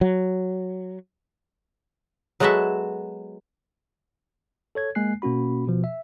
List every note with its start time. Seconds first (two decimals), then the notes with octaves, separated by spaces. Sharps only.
0.01 F#3
2.40 F#3 G#3 B3 F#4 A4 E5
4.75 A4 C#5 G#6
4.95 G#3 A#3 G#5 F#6 C7
5.22 B2 A#3 C#4 F#4 B5
5.67 B2 F3
5.84 E5